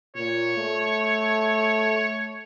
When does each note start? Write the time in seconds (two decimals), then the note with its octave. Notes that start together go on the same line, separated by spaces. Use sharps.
0.16 A#2 C#5
0.57 A3